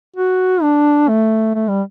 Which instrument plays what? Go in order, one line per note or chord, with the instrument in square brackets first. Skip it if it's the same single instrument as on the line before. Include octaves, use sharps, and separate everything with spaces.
[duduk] F#4
D4
A3
A3
G3